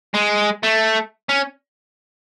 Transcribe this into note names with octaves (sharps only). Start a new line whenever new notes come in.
G#3
A3
C#4